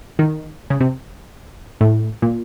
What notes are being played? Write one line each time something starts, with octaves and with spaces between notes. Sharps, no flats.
D#3
C#3
C3
A2
A#2